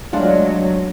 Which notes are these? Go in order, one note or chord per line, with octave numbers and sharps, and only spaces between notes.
F#3 G#3 A3 D4 F4 D5 F#5